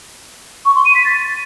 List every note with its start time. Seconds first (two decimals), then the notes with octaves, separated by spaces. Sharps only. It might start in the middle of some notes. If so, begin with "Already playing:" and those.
0.65 C#6
0.75 C6
0.85 D#7
0.95 B6
1.05 A6